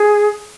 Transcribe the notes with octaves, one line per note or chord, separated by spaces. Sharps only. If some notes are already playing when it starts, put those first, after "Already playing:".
Already playing: G#4